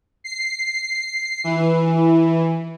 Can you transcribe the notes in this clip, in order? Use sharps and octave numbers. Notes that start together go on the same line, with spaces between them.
C7
E3